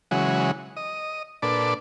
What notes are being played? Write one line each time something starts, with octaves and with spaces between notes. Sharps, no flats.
C#3 E3 F#3 G#3 F#4
D#5
A#2 D4 A4 B4 D5